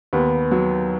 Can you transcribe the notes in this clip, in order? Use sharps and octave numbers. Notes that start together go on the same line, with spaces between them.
D#2 B3
F#3